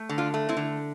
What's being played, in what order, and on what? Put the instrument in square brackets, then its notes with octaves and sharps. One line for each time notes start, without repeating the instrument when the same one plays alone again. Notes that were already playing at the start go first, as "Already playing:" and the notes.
Already playing: [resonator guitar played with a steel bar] A3
D3
D4 F4
A3
C4 E4
D3